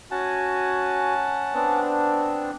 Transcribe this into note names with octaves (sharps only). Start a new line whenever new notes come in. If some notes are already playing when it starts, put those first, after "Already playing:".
C#4 F#4 F#5 G#5 A5
B3 C4 D4